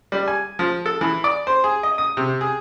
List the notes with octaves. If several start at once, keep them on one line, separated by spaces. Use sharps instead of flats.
G3
G#5
F3
A4
E3
D5
C5
G#4
D#5
D#6
C3
G#4